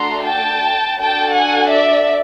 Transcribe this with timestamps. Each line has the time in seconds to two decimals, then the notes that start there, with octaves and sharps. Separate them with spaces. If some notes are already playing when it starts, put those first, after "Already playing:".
Already playing: A3 D4 F#4 A4 A#5 C6
0.26 G5 A5
0.98 D4 F#4 A4 G5 A5
1.34 F#5 G#5
1.71 D5 E5